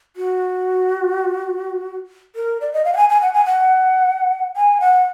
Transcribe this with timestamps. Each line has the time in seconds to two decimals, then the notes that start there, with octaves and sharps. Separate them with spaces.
0.16 F#4
2.36 A#4
2.61 D5
2.73 D#5
2.85 F5
2.93 F#5
2.97 G#5
3.09 G#5
3.22 F#5
3.33 G#5
3.46 F#5
4.56 G#5
4.80 F#5